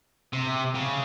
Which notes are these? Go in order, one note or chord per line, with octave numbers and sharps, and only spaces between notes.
C3
C#3